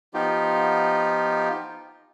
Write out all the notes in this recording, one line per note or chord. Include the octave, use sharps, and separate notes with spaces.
F3 B3 D#4 F4 G4